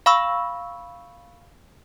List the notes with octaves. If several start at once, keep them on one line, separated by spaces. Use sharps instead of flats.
F5 B5 C#6 E6